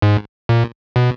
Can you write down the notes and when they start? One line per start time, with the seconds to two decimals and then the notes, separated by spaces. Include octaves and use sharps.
0.02 G#2
0.49 A#2
0.96 B2